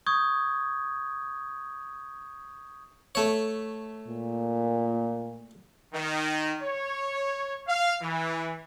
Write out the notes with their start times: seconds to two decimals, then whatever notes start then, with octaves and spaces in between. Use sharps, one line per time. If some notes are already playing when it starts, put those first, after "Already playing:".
0.06 C#6 D#6 G6 G#6
3.15 A3 C#5
4.07 A#2
5.94 D#3
6.62 C#5
7.68 F5
8.02 E3